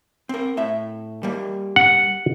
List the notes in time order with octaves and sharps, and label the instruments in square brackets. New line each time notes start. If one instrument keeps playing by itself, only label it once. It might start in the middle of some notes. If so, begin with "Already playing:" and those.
[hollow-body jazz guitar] C4 A#4
A2 E5
G3 A#3
[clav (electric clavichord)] F#5